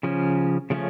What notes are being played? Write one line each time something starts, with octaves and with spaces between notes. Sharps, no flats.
C#3 F3 C#4
C#3 F3 A3 C#4